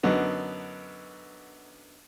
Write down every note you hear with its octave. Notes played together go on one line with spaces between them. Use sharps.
F#2 D3 B3 D#4